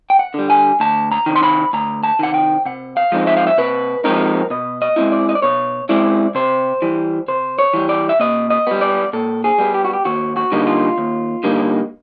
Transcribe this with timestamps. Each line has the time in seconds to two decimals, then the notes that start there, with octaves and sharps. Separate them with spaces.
0.10 G5
0.19 F#5
0.34 D3 G3
0.50 G#5
0.80 D2 A5
1.11 A#5
1.26 C3 D#3
1.36 C6
1.43 B5
1.73 D2 A#5
2.03 A5
2.19 C3 D#3 F#5
2.34 G5
2.65 C3 F#5
2.97 F5
3.12 F3 G#3 C4 D#4
3.27 E5
3.37 F5
3.47 E5
3.58 C3 B4
4.04 F3 G#3 C4 D#4 A#4
4.50 B2 D#5
4.82 D#5
4.96 G#3 C4 E4
5.12 D5
5.29 D#5
5.35 D5
5.42 B2 C#5
5.89 G#3 C4 E4 D5
6.35 C3 C5
6.82 E3 G3
7.28 C3 C5
7.59 C#5
7.73 E3 G3
7.89 D5
8.09 E5
8.20 A#2 D#5
8.50 D#5
8.67 G3 B3
8.81 D5
9.13 A#2 A4
9.44 G#4
9.58 G3 B3
9.74 G4
9.84 F#4
9.93 G4
10.05 D#2 F#4
10.37 F#4
10.52 D3 G3 A#3 D#4
10.67 F4
10.98 D#2
11.44 D3 G3 A#3 D#4